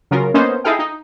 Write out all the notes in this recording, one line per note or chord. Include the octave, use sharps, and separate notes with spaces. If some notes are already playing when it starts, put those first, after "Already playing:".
C#3 F#3 C#4 F4 A#4
A#3 B3 C#4 D#4 C5
D#4 E4 G#4 A4 F5 G5
D#4